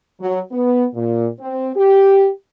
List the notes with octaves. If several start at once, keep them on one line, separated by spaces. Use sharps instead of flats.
F#3
B3
A#2
C4
G4